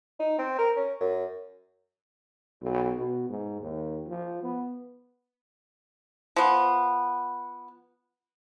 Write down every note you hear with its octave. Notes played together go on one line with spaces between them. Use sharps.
D#4
C4
A#4
C#4
F#2
B1
B2
G#2
D#2
F3
B3
F3 B3